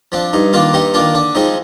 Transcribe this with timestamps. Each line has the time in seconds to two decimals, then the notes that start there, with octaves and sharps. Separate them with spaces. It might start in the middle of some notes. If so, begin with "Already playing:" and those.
0.12 F3 C4 D4
0.33 G2 D#4
0.53 D#3 A#3 D4 F4
0.73 G2 D#4 G4
0.94 D#3 A#3 D4 F4
1.14 D3 D4
1.35 F3 G#3 C4 D#4